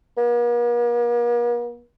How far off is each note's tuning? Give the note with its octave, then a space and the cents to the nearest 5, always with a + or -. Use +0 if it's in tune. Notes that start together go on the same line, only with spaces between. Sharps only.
A#3 +45